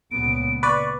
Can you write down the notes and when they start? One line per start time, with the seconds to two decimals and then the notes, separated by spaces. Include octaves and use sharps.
0.11 C#2 A#2 B3 D7
0.63 B4 D5 C#6